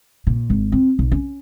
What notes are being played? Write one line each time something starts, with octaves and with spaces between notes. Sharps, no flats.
A#2
G#1
C4
B1
C#4